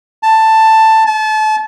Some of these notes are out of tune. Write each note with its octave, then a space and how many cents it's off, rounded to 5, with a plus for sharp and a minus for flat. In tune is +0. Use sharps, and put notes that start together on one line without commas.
A5 +10
A5 -30